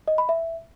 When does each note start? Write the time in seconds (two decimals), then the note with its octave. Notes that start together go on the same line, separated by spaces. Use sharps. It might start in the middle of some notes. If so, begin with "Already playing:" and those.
0.08 D#5
0.18 B5
0.29 E5